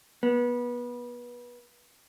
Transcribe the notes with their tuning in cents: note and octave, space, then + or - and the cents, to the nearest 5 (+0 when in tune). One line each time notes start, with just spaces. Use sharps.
B3 -25